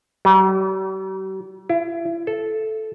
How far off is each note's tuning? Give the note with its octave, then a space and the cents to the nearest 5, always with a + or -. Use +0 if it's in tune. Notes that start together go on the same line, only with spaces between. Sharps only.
G3 -45
E4 +35
A4 -10